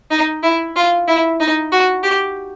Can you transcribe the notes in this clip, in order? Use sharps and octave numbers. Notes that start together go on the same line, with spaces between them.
D#4
E4
F4
E4
D#4
F#4
G4